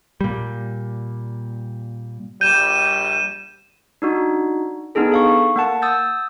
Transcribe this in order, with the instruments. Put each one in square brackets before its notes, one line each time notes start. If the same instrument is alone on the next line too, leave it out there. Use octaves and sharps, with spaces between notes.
[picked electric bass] A#2 G3
[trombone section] A#1 G3 [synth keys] G6 [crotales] D#7 E7
[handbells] D4 D#4 F#4
B3 D4 D#4 G#4 A4
A4 F5 C#6
A#3 F#5 A5
D#6 E6 G6 A6